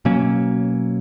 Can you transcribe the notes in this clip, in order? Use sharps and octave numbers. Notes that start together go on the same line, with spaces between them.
B2 F#3 A#3 C#4